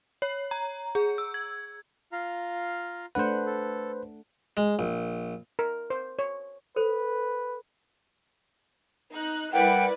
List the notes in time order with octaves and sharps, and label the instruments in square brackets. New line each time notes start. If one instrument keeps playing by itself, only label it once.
[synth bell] C#5
A#5
G#4
E6
G#6
[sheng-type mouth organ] F4 F5 A#5
[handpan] A3 D4 F#5 [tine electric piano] B4 C5
[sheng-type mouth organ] A4
[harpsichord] G#3
A#1
[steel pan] A#4
C5
C#5
[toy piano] A4 C5 [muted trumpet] B4
[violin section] D#4 F#6
[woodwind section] G3 A#4 F#5 [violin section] E4 B4 D5 [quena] G5